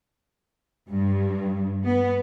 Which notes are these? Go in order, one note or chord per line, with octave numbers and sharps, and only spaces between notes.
G2
B3